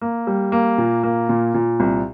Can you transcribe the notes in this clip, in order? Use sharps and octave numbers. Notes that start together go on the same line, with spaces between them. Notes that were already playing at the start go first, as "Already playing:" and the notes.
A#3
G3
A#3
A#2
A#3
A#2
A#2
C2